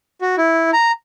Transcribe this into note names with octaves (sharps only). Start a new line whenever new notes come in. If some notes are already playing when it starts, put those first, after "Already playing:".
F#4
E4
A#5